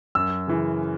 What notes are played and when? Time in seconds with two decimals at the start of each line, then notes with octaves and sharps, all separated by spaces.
0.15 F#2 E6
0.48 C#3 E3